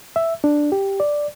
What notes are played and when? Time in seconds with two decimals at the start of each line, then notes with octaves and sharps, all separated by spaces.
0.16 E5
0.44 D4
0.72 G4
1.00 D5